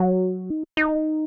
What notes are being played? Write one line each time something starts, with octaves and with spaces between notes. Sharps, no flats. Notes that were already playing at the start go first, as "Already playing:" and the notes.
Already playing: F#3
D#4
D#4